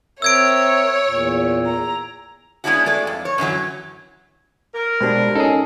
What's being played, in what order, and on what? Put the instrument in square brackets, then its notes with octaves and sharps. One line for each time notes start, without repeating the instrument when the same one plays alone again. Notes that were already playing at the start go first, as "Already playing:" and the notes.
[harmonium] C4 A#4 E5 [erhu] C#5 [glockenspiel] E6 G#6 D7
[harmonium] E2 A#2
[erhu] A#5
[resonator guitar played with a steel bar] G#3 B3 C#4 D4 E4 F#4
G#3 A3 D5
F2
C#5
F#2 D3 E3 F#3
[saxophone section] A#4
[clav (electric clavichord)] B2 D4 [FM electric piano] G#3 G4 C5
[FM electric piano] C#4 D#4 [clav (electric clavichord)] G#4 A4